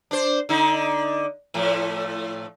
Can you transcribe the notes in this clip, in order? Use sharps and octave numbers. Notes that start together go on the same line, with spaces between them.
D4 C5
D3 D#4
A2 F3 A3